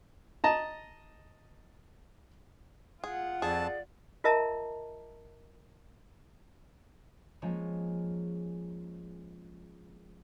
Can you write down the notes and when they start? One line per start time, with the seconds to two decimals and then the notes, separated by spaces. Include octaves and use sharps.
0.44 D#5 A5 A#5
3.04 F4 G#4 F#5
3.42 F2 G#4 D5 A5
4.24 F4 A#4 D#5 E5 A5 A#5
7.42 F3 G#3 A#3 C#4